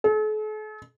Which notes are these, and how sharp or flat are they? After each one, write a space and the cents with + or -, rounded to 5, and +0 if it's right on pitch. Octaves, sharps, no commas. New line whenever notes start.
A4 -45